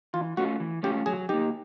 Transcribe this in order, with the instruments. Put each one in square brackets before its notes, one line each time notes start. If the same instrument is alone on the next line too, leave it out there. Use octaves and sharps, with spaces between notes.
[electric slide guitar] E3 [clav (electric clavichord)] F4
[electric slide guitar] A3 C#4 F4 [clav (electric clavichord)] F#4
[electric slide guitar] E3
[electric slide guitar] A3 C#4 F4 [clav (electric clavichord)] G4
[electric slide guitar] F#3 [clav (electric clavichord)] G#4
[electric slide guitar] A#3 D#4 [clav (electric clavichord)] G4